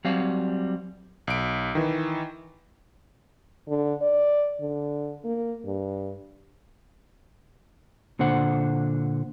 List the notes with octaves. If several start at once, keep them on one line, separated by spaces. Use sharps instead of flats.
F#3 G3 C4 F5
B1 D7
D#3 E3
D3
D5
D3
A#3
G2
A#2 D3 C5 F#5